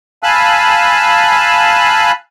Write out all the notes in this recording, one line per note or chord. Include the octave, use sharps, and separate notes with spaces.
F5 G#5 A5 B5 E6 F#6